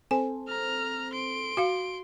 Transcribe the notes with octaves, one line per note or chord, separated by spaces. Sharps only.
C4 A4 C5 G#5
A#5 F6
C6 D7
F#4 F5